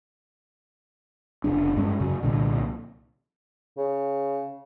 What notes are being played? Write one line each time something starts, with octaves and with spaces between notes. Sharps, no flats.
F1 C#3 D4
G2 G#3 C#4
F#2 C#3
C2 A#2 D3
C#3